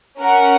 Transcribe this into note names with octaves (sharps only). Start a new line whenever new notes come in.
C#4 A#4 F#5